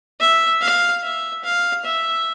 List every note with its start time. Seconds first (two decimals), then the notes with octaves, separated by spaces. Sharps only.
0.20 E5
0.62 F5
1.03 E5
1.44 F5
1.85 E5